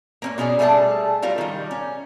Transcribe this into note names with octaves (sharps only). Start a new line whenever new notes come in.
A#3 C4 C#4
B2 C#4 G#4 D5
G3 A3 D4 G#4 D5 A5
F#3 G3 F4 A#4
D#3 G3
C#4